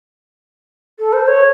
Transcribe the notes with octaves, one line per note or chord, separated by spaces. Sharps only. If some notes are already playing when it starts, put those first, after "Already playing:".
A4
C5
C#5